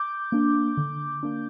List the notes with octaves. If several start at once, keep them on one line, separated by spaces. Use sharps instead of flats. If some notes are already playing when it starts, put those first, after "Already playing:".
Already playing: D6 G6
A#3 D4
D3
A#3 D4